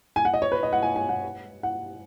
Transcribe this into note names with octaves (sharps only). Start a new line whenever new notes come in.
G#5
F#5
D#5
C#5
B4
D#5
F#5
G#5
G#5
F#5
F#5